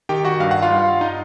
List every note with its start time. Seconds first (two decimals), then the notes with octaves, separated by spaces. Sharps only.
0.09 D#3 G4 G5
0.25 F#4 F#5
0.40 G2 F5
0.51 F#5
0.62 F4 F5
0.70 G2
1.01 D#4 D#5